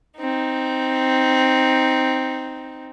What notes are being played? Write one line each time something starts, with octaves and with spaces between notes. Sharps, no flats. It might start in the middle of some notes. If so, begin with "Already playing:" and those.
C4 D#4